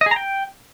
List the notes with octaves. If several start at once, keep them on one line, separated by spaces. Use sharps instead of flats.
D#5
G#4
A#5
G5